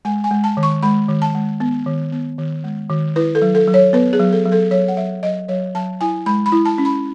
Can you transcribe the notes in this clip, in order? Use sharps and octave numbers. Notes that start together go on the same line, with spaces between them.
G#3 G#5
G#5
G#3
A5
D#3
C#6
G#3 B5
D#3
A5
G#3
B3
D#3
B3
D#3
G#3
D#3
E4 B4
A4
F#3
A4
F#3
C#5
B3 B4
G#4
F#3
A4
F#3
A4
F#3 C#5
F#5
F#3 E5
F#3 D#5
F#3 C#5
F#3 A5
E4 G#5
G#3 B5
B5
E4
A5
C#4
B5